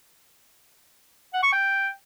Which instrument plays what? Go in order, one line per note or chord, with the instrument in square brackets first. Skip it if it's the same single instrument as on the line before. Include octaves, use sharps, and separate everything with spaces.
[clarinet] F#5
C#6
G5